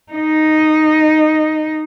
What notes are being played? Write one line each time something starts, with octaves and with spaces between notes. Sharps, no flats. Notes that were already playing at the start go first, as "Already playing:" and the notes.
D#4 D#5